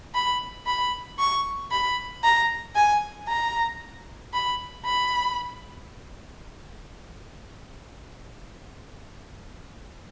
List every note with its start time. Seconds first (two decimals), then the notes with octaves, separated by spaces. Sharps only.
0.14 B5
0.67 B5
1.19 C#6
1.71 B5
2.24 A#5
2.75 G#5
3.28 A#5
4.33 B5
4.85 B5